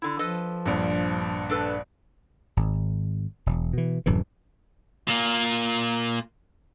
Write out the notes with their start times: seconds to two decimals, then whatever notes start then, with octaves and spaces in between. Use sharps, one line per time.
0.02 D3 E4
0.19 F3 A4 B4 D#5
0.66 A#1 G2
1.50 D4 A4 B4
2.57 G#1
3.46 E1
3.73 B2 E3
4.06 D1 F#2 A2 E3
5.08 A#2 A#3